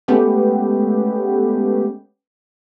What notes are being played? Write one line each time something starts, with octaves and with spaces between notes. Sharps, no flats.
G#3 A3 B3 C#4 G4